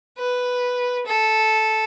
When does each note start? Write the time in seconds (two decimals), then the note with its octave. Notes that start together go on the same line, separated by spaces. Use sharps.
0.18 B4
1.06 A4